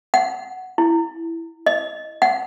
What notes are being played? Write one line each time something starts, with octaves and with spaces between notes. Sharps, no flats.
F#5
E4
D#5
F#5